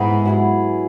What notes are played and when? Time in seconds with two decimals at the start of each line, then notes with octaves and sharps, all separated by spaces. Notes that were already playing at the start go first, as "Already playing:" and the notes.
Already playing: G#2 E3 B3 G#4
0.25 F#3 E4 G#4